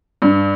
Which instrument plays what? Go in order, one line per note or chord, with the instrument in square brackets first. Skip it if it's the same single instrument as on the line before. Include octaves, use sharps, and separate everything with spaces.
[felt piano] G2